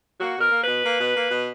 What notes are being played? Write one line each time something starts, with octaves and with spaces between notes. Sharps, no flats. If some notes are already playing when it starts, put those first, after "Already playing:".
A#3 F#4
B2 A#4
A#3
B2 B4
A#3
B2
A#3
B2